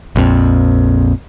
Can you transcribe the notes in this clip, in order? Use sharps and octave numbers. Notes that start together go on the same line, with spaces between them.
A#1 F2